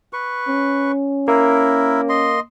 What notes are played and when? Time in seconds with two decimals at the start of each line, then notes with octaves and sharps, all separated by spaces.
0.13 B4 C#6
0.48 C#4
1.28 A#3 E4 A#4
2.09 D#5 C6